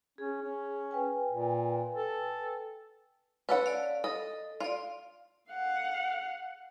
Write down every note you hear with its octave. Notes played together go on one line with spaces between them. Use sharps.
C#4 G#4
C#4
B4 G5 G#5
A#2
A4
C#4 A4 B4 F#5 B5
D5 F5
A4 D#5
F4 D5 F5
F5 F#5